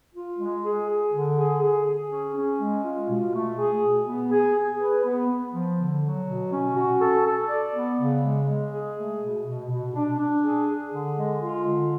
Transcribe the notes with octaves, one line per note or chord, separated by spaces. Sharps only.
F4
G#3
G#4
G#4
D3
G#4
G#4
G#4
C#4
C#4
G#3
F4
B2
A3
G#4
B2
B3
G#4
G#4
B4
B3
B3
F3
D3
F#3
B2
C#4
F#4
A4
A4
D5
B3
C#3
G#3
G#3
G#4
A3
B2
B2
B2
D4
D4
G#4
G#4
D3
G#3
F4
D3